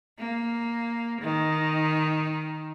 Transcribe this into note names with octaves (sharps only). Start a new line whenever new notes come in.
A#3
D#3